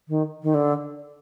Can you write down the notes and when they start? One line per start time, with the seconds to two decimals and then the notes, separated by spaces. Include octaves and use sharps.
0.09 D#3
0.43 D#3
0.54 D3